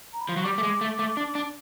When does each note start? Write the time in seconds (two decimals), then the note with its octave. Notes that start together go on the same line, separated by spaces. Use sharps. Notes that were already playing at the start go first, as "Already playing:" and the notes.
0.13 A#5
0.21 B5
0.29 F3 C6
0.36 F#3 C#6
0.44 G3 D6
0.58 A3
0.63 G#3
0.81 A3
0.99 A3
1.17 D4
1.35 D4